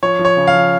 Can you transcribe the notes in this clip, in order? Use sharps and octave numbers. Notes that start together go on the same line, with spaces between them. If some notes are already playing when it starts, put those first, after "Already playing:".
F3 C#5
F3
C#5
C#3
F5
F3